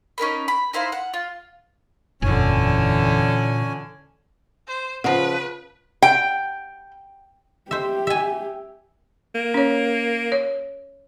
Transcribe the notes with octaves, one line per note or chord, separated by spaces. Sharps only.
C#4 D#4 A#4 B5
B5
D#4 E4 C5 F5
F#5
F4
F#1 E2 A#2 D3 E3 C#4 G#5
C5
C#3 F3 B4 F#5
G5
G4 C5 E5
E5 G#5
A#3
C#4 C#5
C#5